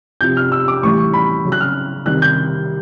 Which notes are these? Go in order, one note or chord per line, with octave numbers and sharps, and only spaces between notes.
C3 F3 G6
F6
E6
D6
A2 E3 G3 C#6
C#6
B5
C#3 F#3
F#6
F6
C3 D#3 G3 F#6
G6